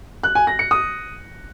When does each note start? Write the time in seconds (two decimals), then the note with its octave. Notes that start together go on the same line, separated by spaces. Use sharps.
0.23 F#6
0.35 G#5
0.47 A#6
0.59 C#7
0.71 D#6